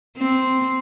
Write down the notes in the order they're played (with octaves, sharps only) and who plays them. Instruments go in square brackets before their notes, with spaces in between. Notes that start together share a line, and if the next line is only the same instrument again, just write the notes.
[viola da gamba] C4